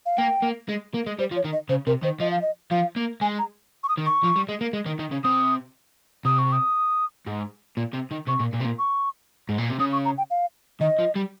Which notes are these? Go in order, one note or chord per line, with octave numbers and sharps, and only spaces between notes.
F5
A#3 G5
A#3
G#3
A#3
G#3
G3 C5
F3
C#5
D#3
D#5
C#3 C5
C3 A#4
D#3 C5
F3 D#5
F5
D#5
F3 F5
A#3
G#3 G#5
A#5
C#6
D#6
D#3
C#6
F3
G3
G#3
A#3
G#3
D#3
D#3
C#3
C3 D#6
C3 D#6
C#6
D#6
G#2
A#2
C3
D#3
C3 C#6
A#2
A#2
C3
A#2
C#6
G#2
A#2
C3
C#3 D#6
C#6
A#5
G5
F5
D#3 D#5
F3
G3